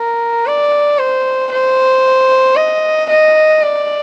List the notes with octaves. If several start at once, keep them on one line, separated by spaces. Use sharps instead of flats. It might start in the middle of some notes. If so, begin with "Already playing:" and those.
Already playing: A#4
D5
C5
C5
D#5
D#5
D5